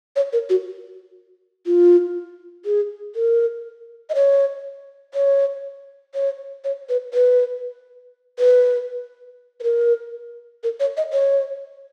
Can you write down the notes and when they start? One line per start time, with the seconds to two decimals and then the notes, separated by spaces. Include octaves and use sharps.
0.16 C#5
0.33 A#4
0.49 F#4
1.66 F4
2.65 G#4
3.15 A#4
4.10 D#5
4.15 C#5
5.14 C#5
6.15 C#5
6.64 C#5
6.89 B4
7.14 B4
8.39 B4
9.60 B4
9.63 A#4
10.64 A#4
10.80 C#5
10.97 D#5
11.13 C#5